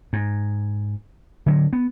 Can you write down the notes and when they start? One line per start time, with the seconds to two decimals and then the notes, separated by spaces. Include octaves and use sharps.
0.13 G#2
1.46 D3 F#3
1.73 B3